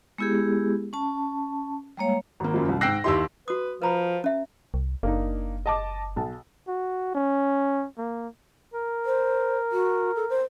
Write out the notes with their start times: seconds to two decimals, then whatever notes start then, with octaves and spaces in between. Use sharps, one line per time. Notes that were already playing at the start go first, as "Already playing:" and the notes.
0.18 G#3 B3 E4 G4 G#4
0.93 C#4 A5
1.97 G3 G#3 A#3 C#5 F5
2.40 G#1 A#3
2.54 F#2 F3
2.69 C2
2.81 G#2 G5 E6 F#6 A#6 C7
3.04 D#2 E4 G4 C6 E6
3.48 F#4 B4 D#6
3.82 F3 B4 A#5 B5
4.24 C#4 E5
4.74 C2
5.03 F#1 A#3 D4 D#4
5.66 D#5 A5 D6
6.16 B1 A5
6.68 F#4
7.15 C#4
7.98 A#3
8.74 A#4
9.05 C5
9.72 F#4
10.16 A4
10.30 C5